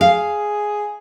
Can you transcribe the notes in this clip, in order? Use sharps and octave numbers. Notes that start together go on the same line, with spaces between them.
G#4 F5